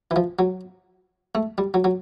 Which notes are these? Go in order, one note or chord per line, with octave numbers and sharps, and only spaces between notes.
E3
F3
F#3
A3
G3
F#3
F#3